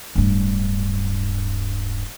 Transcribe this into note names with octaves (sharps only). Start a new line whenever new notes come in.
D1 G2